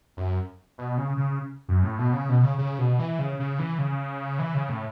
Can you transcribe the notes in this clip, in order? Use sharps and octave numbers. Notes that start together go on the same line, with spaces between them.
F#2
B2
C#3
C#3
F#2
A2
B2
C#3
B2
C#3
C#3
B2
E3
C#3
C#3
E3
C#3
E3
C#3
A2